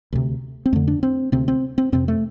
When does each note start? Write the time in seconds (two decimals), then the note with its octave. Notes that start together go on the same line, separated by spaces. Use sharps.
0.13 D2 C3
0.66 C4
0.73 F2 D3 A3
0.88 D4
1.03 C4
1.32 D2 C3 C4
1.48 C4
1.78 C4
1.92 F2 C3 C4
2.08 A3